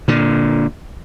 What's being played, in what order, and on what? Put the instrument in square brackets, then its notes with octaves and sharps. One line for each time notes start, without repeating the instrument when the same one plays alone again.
[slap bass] A#2 D3